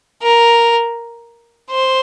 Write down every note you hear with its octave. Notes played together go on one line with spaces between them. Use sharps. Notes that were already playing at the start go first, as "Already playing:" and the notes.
A#4
C5